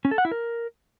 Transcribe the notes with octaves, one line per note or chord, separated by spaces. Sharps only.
C#4
A4
F#5
E4
A#4